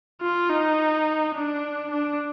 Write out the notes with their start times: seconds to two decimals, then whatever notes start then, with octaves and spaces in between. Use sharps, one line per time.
0.22 F4
0.50 D#4
1.35 D4
1.91 D4